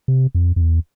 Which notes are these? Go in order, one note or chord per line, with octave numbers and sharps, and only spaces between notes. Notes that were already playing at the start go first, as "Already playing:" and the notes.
C3
F2
F2
E2